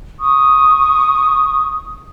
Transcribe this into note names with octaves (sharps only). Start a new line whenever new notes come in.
C#6 D#6